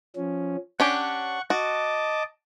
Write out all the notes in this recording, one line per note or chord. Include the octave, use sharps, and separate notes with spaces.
F3 C#4
C#4 D4 G4 F#5 C#6
F#4 D#5 A5 D6